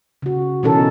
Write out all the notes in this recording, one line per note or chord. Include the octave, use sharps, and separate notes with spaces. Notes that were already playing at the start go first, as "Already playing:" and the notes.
C#3 F#4
B2 E3 C#4 D#4 A4 A#4